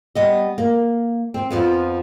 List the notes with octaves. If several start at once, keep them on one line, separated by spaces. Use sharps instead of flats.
G3 B3 D#5
A#3
C4
F2 F3 B3